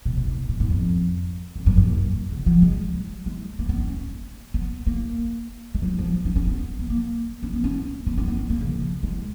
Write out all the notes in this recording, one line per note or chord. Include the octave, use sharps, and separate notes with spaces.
B2
A#2
B2
A#2
G#2
F2
F2
F#2
F#2
A#2
C#3
F3
G#3
F#3
G#3
A#3
B3
C#4
B3
A#3
G#3
F#3
F3
F3
C#4
C#4
B3
B3
A#3
C#4
B3
C#4
B3
C#4
B3
C#4
A#3
C#3
F3
G#3